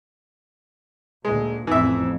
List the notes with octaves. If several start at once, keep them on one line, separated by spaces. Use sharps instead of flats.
D2 A#2 G#3
A1 F2 E3 E5